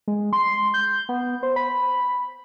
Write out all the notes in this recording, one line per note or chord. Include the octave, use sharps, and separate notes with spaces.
G#3
C6
G6
B3
C5
B5